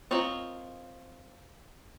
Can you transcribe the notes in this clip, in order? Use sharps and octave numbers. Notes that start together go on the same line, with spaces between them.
C4 F4 A#4 C#5 D#5